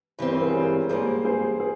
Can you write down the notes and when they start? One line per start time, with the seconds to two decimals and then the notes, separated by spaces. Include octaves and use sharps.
0.19 G2 E3 G3 C4
0.30 A#4 C#5
0.43 G#4 C5
0.54 A#4 C#5
0.89 G#2 G3 A#3 G#4 C5
1.25 G#4 C5
1.60 G#4